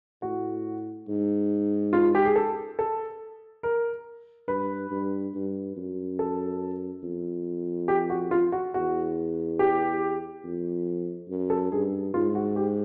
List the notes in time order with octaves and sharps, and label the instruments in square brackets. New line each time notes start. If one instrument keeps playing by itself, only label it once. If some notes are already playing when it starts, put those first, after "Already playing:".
[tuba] A2 [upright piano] F#4
[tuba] G#2
[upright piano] F4
G4
G#4
A4
A4
A#4
[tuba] G2 [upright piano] B4
[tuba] G2
G2
F#2
[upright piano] A4
[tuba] F2
[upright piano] G4
F#4
F4
F#4
[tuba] E2 [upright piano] F#4
[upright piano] G4
[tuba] F2
F#2
[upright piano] A4
[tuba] G2 [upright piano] G#4
[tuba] G#2 [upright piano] F4
[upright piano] F#4
G4